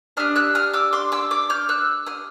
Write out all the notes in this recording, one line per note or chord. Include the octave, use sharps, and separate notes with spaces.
D4 G4 D#6 F6
E6 F#6
D#6 F6
D6 E6
C6 D6
D6 E6
D6 E6
F6 G6
E6 F#6
D#6 F6